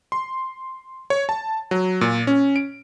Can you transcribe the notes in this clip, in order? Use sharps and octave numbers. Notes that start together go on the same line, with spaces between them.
C6
C#5
A5
F#3
A#2
C#4
D7